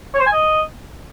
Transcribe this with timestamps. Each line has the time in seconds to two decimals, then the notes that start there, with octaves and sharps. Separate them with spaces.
0.14 C#5
0.20 C5
0.26 G#5
0.32 D#5